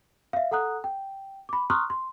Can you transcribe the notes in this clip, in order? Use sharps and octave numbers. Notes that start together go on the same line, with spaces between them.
E5 F5
A4 F#5 A#5 D#6 F#6
G5
B5 D6
A#5 C6 C#6 D#6 F6 F#6
C6